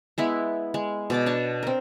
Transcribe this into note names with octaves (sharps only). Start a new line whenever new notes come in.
G#3 B3 E4
G#3
B2 D5 D6
D4 C#5 A5
C4 A#4